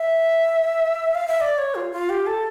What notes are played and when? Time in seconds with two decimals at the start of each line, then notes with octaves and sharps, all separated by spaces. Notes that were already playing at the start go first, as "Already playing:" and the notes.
Already playing: E5
1.15 F5
1.28 E5
1.41 D5
1.58 C#5
1.75 F4
1.92 F4
2.09 G4
2.26 A4